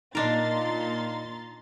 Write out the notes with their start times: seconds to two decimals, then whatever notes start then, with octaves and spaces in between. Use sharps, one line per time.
0.15 A#2 D4 D#4 A#4 D#5 A#5 C6 A6